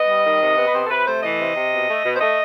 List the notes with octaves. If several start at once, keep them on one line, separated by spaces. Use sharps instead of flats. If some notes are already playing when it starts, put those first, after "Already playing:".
Already playing: B3 D#5
G3
D#3
C3
B3
B4
C3 C5
A4
C3 B4
A3 C5
E3 D#5
C3
C3
B2
A3
B2
C5
A3 D#5